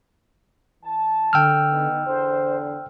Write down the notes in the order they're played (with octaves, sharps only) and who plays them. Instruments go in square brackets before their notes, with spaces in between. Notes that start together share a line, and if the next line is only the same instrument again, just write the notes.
[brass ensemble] E3 A5
[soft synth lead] D3 [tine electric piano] G5 E6 F6
[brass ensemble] B3 D#4
[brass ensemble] E2 D3 [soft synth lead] C5